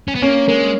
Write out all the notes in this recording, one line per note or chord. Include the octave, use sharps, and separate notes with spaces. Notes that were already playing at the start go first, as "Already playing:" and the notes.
C#4
B3
A#3 C#4
G#3 A#3